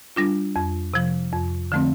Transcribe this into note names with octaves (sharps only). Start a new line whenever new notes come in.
G3 D4 F4
F2
C3 F3
F2
D3 F3 A3 C4